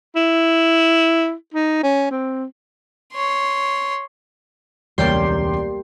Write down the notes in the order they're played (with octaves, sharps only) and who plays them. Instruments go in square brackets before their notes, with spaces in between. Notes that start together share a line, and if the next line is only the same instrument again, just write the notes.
[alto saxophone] E4
D#4
C#4
C4
[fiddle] C#5 C6
[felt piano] E1 C#2 C#5 [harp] G3 A#3 [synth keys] D5 G5 C6